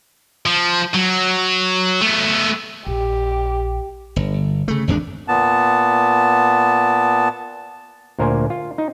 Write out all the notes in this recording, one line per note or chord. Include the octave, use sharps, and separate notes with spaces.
F3
F#3
A3 B3
A#1 G4
G1
C#3 A3
G#1 E2 G#3 D4
A#2 B3 A5
D2 A#2 A#4 C5 G#5
F4
D#4